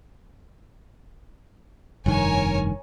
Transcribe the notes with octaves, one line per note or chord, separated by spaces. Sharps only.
F1 G2 D#3 A#4 C#5 G#5